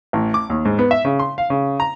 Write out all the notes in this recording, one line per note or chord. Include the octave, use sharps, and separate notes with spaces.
A1
D6
D#2
G#2
B3
E5
C#3
C6
F5
C#3
A#5